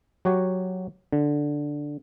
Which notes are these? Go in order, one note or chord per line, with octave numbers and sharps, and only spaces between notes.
F#3 F#4 G4 C#5
D3